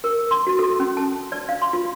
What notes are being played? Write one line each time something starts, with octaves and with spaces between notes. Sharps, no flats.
A#4
C6
F#4
A4
C#4
A5
D5
F5
C6
F4